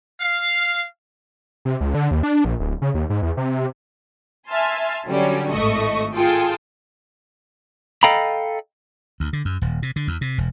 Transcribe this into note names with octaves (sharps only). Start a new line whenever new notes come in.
F5
C3
C#2
D3
D#2
D4
A#1
D1
C#3
D#2
G#2
E2
C3
E5 G#5 A5 C6 F6
D3 F#3 G3 C#4
G#1 A2 A3 A4 D#5 C#6
F4 G#4 A4 G5
A4 D#5 F5 G5 A#5 B5
D2
D3
F#2
D#1
C3
D3
E2
C3
E1